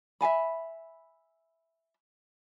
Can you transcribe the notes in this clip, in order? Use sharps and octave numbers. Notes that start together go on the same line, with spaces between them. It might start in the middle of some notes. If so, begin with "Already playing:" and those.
E5 F5 G#5 B5